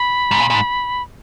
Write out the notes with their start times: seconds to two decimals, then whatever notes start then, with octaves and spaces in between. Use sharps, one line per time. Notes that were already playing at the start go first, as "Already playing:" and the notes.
Already playing: B5
0.31 G#2
0.40 A#2
0.50 A#2
0.54 G#2